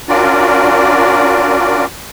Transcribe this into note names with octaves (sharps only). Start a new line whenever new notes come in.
C#4 D4 F4 F#4 A#4 D5